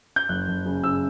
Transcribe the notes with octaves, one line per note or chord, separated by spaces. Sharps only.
G6
F#1 F#6
F#1
C#3
C#3 E6